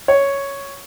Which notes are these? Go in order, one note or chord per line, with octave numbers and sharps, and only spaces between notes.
C#5